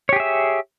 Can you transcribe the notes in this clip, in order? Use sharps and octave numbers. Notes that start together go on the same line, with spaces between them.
G4 G#4 C#5 E5